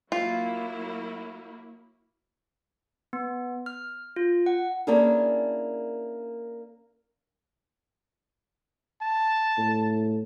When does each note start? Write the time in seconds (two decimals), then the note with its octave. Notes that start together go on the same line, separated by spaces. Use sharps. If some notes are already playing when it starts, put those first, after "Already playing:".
0.12 F#3 A#3 E4 F4
3.13 B3
3.66 F6
4.16 F4
4.46 F#5
4.87 A#3 C#4 D4 E4 G#4 A#4
9.02 A5
9.58 A2